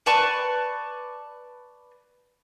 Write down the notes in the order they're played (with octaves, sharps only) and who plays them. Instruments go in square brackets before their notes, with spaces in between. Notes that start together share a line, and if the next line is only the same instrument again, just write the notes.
[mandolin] B4 D5 A5 C#6